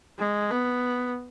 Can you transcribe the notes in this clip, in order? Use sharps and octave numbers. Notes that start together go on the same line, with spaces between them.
G#3
B3